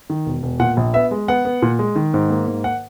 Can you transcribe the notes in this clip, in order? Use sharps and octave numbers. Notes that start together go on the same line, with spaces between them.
D#3
E1
E1
A#2 F#5
A#1
B3 E5
G#3
B3 F#5
B3
A#2
G#3
D#3
G#2
A#3
G#2
F#5